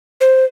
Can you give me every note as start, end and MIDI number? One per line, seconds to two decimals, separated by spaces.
0.21 0.45 72